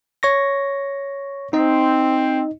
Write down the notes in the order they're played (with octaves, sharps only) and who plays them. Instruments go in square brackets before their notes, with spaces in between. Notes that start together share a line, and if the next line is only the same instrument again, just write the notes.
[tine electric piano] C#5 C#6 A#6
[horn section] C4 [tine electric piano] D#4 D#5